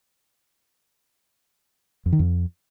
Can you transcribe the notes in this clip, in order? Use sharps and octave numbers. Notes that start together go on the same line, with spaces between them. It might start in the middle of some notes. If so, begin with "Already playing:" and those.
F2
D#3
F2